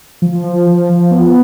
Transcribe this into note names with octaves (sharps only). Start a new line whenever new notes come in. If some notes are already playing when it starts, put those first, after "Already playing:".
F3
F3
F3
F3
B3